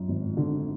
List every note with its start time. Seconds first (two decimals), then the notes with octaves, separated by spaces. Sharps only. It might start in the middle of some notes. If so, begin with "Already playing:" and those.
Already playing: F#2 F3
0.08 G#1
0.37 D3